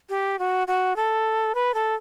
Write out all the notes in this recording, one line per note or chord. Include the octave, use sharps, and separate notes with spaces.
G4
F#4
F#4
A4
B4
A4